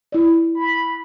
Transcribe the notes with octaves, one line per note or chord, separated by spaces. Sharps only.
E4 D5
B5